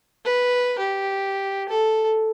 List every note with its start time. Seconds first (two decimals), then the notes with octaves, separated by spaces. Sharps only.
0.25 B4
0.78 G4
1.69 A4